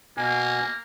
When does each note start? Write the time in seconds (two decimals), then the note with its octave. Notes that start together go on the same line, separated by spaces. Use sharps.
0.17 B2 A#3 G#5